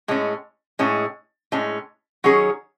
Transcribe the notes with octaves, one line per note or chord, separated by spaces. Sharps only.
A2 G#3 C#4
A2 G#3 C#4
A2 G#3 C#4
D#3 F#3 C#4 G#4 C#5